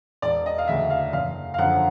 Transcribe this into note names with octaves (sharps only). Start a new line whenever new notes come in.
E1 D5
D#5
F5
D2 C#3 E5
F5
F#1 F5
F5
F#2 D3 F3 F#5